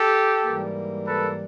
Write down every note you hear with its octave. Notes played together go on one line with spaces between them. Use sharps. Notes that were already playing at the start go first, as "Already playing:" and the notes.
Already playing: G4 A4
G#2 E3 G3 A#3
A4 B4